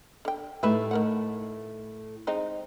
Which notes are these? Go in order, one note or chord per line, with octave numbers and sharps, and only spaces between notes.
D3 G5
A2 A3 D#4 G4 B4 E5
D#3 A#4 F#5
G#3 C4 D#4